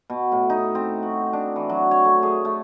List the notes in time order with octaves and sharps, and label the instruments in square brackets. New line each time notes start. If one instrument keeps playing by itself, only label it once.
[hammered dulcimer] B2
A2
D#4
C4
F#4
D4
E3
F#3
C#5
A3
G#4
A3